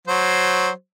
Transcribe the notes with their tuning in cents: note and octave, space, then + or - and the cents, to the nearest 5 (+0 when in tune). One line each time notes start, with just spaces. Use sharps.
F#3 +0 C5 +0